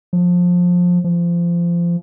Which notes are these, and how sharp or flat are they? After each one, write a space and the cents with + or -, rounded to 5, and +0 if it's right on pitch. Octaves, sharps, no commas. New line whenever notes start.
F3 +20
F3 -25